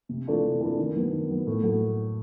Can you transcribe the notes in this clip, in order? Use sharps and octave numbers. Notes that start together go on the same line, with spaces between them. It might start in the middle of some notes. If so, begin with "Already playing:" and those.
C3
E3 A3 D4 F4
C3
E3 A3 D4 F4
D#3
F#3 B3
D#3
F#3 B3
A2
F#3 A3